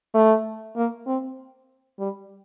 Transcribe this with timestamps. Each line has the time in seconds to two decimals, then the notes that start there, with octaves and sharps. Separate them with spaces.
0.14 A3
0.76 A#3
1.07 C4
1.99 G3